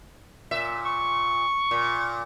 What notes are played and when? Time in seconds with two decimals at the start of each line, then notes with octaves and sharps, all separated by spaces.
0.51 A#2 E5
0.86 C#6
1.71 A#2